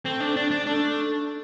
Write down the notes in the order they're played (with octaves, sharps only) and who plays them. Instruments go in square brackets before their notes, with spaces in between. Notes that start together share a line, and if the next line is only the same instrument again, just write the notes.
[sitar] A3 [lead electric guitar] C4
[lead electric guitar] D4
D4
D4
[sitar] A3 [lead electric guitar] D4